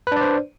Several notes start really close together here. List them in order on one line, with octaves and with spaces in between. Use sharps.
B4 D4 D5 C5